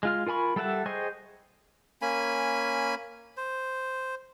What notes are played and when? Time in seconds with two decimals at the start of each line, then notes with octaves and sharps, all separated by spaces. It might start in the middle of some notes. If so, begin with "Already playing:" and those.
0.03 G#3 F4 F6
0.27 F4 A#4 G#5 B5 C#6
0.56 G3 A4 E5 F#5 A5
0.86 G#4 C5 D#5 G5 C#6
2.02 A#3 C#4 G#5 B5
3.37 C5